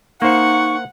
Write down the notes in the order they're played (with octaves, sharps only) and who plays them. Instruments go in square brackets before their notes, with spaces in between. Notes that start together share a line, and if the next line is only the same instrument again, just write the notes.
[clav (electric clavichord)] A#3 C5 [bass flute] D#4 [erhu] F#5 [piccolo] C#6